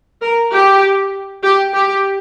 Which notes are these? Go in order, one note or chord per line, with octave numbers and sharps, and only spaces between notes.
A#4
G4
G4
G4